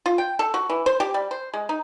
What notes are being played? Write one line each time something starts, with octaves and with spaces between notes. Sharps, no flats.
F4
G5
A4
F#4
E3
C5
G4
G3
C5
G#3
D#4